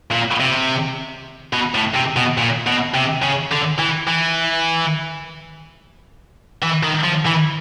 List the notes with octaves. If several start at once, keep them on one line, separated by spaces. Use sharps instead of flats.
A#2
C3
B2
A2
C3
B2
A#2
B2
C3
C#3
D3
E3
E3
E3
D#3
F3
E3